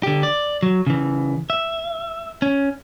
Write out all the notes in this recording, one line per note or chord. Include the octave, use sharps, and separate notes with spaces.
D3 G4
D5
F#3
C#3 E3
E5
C#4